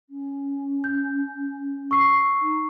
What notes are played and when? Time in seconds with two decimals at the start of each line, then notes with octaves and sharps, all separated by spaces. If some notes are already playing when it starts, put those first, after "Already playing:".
0.10 C#4
0.84 G6
1.91 C#6 E6 C7
2.41 D#4